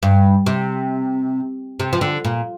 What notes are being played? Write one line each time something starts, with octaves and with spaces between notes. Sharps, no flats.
G2
C3
C3
F3
D3
A#2